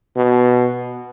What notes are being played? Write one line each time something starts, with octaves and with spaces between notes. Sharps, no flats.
B2